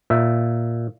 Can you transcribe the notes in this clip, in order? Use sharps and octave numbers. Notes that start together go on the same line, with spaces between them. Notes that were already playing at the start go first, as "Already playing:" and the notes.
A#2 E5